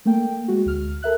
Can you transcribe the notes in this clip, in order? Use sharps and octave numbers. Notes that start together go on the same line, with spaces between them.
A3 A#3 G5
G#3 F#4
D2 F6
A4 A#4 E5 F#6